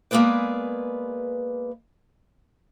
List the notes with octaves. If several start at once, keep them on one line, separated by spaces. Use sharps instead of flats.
G#3 A#3 B3 G#4 B4 D5